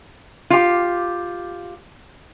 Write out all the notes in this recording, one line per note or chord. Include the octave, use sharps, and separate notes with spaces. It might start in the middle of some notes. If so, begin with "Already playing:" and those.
F4 G4